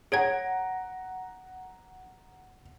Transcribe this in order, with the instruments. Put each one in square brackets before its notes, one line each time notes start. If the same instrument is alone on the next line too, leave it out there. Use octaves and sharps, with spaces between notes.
[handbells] G#4 C#5 G#6 [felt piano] F#5 A#5 D7